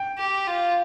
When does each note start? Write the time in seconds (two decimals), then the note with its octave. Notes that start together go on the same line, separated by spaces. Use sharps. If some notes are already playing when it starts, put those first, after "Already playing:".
Already playing: G5
0.18 G4
0.47 F4